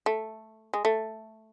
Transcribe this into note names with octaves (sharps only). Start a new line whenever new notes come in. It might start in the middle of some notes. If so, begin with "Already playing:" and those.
A3
G#3
A3